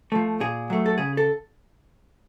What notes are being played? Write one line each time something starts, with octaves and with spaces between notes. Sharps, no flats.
F3 A3
A#2 G#4
F#3 A3
A4
C#3 G#4
A4